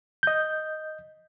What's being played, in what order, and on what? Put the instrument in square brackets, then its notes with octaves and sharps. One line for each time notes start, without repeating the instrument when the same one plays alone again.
[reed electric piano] D#5 G6